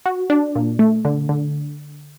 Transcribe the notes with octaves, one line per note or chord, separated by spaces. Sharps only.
F#4
D4
A#2
A3
D3
D3